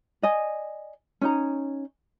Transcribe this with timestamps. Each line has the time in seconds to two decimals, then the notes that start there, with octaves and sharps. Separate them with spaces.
0.22 D5 D#5 G#5
1.21 C#4 D#4 A#5